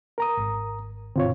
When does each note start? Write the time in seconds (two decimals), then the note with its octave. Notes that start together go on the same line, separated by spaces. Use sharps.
0.18 A#4 A#5 D#6
0.37 G#1
1.16 G1 B2 D3 C4 F4 C#5